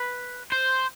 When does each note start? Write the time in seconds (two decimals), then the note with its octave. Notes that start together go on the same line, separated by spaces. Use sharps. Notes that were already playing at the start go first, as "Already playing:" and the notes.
Already playing: B4
0.52 C5